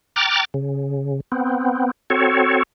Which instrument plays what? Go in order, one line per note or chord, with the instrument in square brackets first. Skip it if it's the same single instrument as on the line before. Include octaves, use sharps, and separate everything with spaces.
[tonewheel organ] G5 A#5 D6 F6 F#6 A6
C#3
B3 C4
C4 F#4 A4 C#5